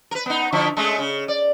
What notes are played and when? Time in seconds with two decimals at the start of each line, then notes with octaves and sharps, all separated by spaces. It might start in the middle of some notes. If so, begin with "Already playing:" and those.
0.11 A#4 B4
0.26 B3 D#4
0.53 D3 F3 E4
0.76 G#3 A3 C#4
0.99 C#3
1.28 D5